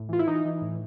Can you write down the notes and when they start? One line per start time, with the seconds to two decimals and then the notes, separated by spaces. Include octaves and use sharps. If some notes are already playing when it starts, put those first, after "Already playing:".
Already playing: A2
0.09 E3 F4
0.19 E4
0.27 E3 D#4
0.45 E3
0.62 A2